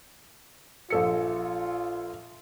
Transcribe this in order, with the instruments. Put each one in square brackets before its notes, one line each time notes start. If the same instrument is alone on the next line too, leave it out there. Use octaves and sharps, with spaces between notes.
[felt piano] A#1 A4 C#7 [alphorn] F4